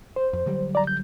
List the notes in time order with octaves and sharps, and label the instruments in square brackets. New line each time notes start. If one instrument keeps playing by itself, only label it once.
[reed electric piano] C5
[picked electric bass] F2
D3 F#3 G3
[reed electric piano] D5 A#5
G6